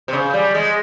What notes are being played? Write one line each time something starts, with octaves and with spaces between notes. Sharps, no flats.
C3
C#3
G3
G#3